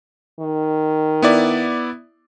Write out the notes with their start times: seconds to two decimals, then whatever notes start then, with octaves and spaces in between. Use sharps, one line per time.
0.40 D#3
1.22 B3 E4 D5